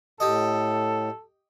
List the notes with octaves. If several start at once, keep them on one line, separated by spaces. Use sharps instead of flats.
A2 G4 A4 D#5